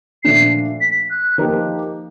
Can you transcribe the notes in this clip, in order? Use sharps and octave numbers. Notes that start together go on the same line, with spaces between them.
A#2 F3 A3 D4 C7
B6
F#6
F3 A#3 D#4 G4